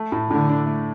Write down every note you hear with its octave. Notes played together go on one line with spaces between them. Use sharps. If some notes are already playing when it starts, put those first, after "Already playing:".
Already playing: A3
A2
A2 D3
D4
A3